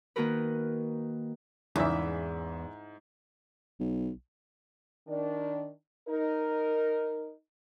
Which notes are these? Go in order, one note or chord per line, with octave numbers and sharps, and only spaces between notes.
D#3 A#3 D#4 F#4 A#4 B4
E2 G#2 C#3 E3 E5
B1
D#3 D4 D5
D#4 A#4